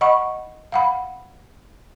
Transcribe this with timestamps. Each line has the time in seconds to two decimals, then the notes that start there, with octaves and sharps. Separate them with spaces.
0.01 D#5 F#5 B5 C#6
0.72 F5 F#5 B5